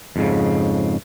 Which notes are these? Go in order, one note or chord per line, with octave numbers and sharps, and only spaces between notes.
F2 G#2 C#3